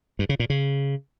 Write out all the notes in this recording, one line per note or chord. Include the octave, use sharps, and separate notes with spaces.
G2
C#3
A#2
C#3